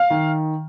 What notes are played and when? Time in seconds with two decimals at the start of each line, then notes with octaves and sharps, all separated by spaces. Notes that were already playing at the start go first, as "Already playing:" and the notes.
Already playing: F5
0.10 D#3